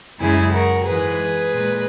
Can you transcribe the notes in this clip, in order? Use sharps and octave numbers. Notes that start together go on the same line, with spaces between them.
F#2 C#3 G#3 E4 G#4
F#4 A#4
G#2 E3 G#3 G#4 B4
A#2 G#3